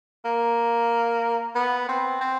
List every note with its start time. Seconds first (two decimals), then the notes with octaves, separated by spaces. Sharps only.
0.25 A#3
1.55 B3
1.89 C4
2.21 C4